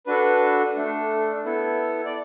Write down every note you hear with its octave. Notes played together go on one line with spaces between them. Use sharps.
D4 F#4 A4 B4
A3 D4 A4
B3 E4 A4
D5